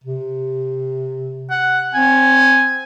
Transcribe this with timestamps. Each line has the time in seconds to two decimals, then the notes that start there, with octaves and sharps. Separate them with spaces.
0.04 C3
1.51 F#5
1.94 C4 G#5